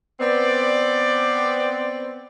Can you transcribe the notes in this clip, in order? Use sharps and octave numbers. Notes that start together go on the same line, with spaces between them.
B3 C4 D5